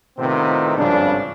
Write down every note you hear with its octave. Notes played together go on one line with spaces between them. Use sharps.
A2 C3 D#3 B3 C4 F4
G#1 G2 C#3 F3 D4